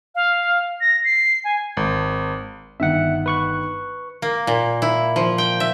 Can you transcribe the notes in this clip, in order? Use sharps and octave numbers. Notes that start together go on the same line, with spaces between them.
F5
A#6
C7
G#5
G#1
G1 D#3 E5 F#5
B4 C#6 F#6
A#3
A#2
E4
F3
G5
E5